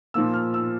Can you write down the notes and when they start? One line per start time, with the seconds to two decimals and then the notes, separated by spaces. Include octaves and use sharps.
0.14 A#2 F3 A#3 E6
0.34 F6
0.54 E6